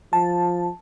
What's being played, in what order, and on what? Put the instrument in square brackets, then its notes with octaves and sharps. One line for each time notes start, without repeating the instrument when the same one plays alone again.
[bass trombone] F3 [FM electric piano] A5